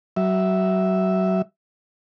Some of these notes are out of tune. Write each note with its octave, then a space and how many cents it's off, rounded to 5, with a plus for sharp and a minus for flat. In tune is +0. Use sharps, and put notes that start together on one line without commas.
F#3 +25 E5 +0